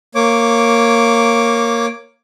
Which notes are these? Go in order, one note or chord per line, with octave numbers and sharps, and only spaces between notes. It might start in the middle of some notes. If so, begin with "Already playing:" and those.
A#3 C#5 D6